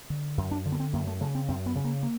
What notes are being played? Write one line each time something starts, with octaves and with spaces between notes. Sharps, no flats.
D3
F#2
D4
D3
B3
C4
F#2 A#3
A3
C#3 A3
C4
F#2 C4
B3
C#3
A#3
A#3